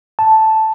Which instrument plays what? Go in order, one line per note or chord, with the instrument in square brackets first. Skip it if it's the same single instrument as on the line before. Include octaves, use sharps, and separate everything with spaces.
[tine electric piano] A5